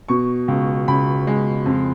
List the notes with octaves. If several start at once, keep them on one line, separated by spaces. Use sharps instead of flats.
B2 C#6
C#2
C#2 B5
G#3
F2